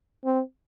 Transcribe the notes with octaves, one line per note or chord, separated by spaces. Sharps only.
C4